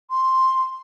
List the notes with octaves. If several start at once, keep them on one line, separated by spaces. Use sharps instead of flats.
C6